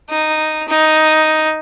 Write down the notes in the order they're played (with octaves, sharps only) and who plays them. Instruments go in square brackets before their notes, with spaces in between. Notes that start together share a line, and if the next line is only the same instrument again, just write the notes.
[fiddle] D#4
D#4